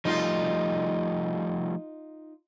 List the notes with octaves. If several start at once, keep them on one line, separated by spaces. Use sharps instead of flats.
F3 G3 A3 D#4 F4